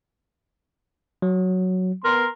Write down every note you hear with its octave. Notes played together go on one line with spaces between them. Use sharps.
F#3
B3 A#4 C6